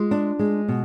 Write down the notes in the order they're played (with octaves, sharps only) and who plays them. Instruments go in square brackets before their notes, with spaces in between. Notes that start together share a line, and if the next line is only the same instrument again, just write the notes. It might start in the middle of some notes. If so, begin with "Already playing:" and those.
Already playing: [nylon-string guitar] G#3 F4
D4
G#3
B2